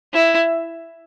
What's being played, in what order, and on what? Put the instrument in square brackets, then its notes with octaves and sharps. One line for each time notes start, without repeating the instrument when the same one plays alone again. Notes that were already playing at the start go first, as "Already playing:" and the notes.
[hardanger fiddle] E4